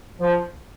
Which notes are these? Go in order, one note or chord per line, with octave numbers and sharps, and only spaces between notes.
F3